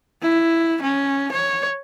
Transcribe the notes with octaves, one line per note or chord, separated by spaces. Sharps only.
E4
C#4
C#5